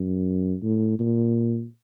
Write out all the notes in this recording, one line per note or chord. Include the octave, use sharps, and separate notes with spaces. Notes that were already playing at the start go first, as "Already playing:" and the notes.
Already playing: F#2
A2
A#2